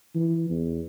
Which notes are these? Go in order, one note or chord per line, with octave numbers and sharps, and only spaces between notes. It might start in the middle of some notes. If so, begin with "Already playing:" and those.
E3
E2